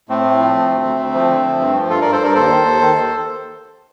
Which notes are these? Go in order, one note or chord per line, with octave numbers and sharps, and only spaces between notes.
A2 A3 C4
A2
F3
F3
D2
D2
D2
F3
D3
F3
G2
F3
G2 F4 A4
G2 A#4 D5
A4 C5
G2 A#4 D5
D#2 A4 C5
D#3
D#2
D#3
D#2